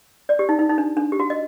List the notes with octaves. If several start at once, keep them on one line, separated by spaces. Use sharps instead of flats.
D5
G4
D#4
D#4
D#4
D4
D4
G4
F#4
D#5